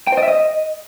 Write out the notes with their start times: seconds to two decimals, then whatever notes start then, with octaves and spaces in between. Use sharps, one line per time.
0.07 G5
0.12 C5
0.17 D#5
0.23 E5
0.28 D#5